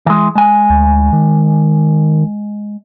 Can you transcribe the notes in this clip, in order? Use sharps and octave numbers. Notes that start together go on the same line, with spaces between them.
E3 G#3
G#3 G#5
D2
D#3